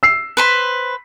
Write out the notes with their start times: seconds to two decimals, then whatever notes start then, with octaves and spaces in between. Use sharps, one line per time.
0.03 E6 C7
0.37 B4 C5 B5